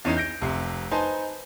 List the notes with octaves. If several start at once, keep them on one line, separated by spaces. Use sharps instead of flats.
E2 E3 C#4 D#4
G6 A#6 D7
F1 C3
D#4 B4 C5 G#5 A5